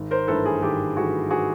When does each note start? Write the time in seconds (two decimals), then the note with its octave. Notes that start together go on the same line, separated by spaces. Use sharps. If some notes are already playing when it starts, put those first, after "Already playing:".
Already playing: G#1
0.11 A#4 C5
0.27 G2 E3 A3 A4 B4
0.45 G#4 A#4
0.62 G#1 G4 A4
0.96 G2 E3 A3 F#4 G#4
1.30 F#4 G#4